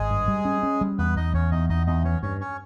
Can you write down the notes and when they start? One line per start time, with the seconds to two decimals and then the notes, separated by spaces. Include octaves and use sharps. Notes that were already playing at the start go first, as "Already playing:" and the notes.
Already playing: G#1 G#3 G#4
0.10 G2
0.28 G3
0.45 C#4
0.63 C#4
0.81 G3
0.98 E2 B3 B4
1.16 E2 D#4 D#5
1.33 E2 C#4 C#5
1.51 E2 D#4 D#5
1.69 E2 D#4 D#5
1.87 E2 D#4 D#5
2.05 E3 C#4 C#5
2.22 G2 C#4 C#5
2.40 C#4 C#5